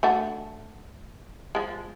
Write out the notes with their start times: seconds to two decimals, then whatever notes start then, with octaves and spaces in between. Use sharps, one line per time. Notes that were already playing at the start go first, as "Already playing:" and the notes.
0.03 A3 D4 F#4
1.55 F3 G#3